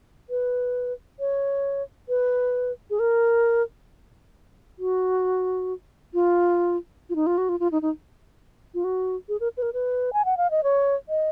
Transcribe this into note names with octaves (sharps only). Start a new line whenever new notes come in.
B4
C#5
B4
G#4
A#4
F#4
F4
F4
D#4
F4
F#4
F4
F4
D#4
D#4
F4
F#4
G#4
A#4
B4
A#4
B4
G#5
F#5
F5
D#5
C#5
D#5